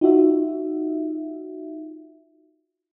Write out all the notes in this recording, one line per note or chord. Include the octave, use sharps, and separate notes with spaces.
D#4 F4 F#4 E5